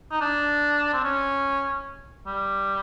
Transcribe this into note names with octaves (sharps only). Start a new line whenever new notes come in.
D#4
D4
C4
C#4
G3